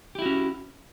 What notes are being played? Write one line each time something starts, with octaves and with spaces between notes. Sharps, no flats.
C#4 E4 F#4 G4